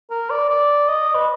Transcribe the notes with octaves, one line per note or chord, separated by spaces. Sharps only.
A#4
D5
D5
D#5
B4